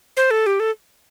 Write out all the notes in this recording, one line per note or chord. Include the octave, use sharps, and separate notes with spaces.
C5
A4
G4
A4